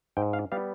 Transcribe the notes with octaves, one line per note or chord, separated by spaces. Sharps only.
G#2 G5
F5
G3 B3 F5